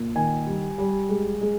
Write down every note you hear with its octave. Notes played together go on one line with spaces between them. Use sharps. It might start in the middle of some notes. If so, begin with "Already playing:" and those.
Already playing: A#2
D#3 G#5
G3
G3
G#3
G#3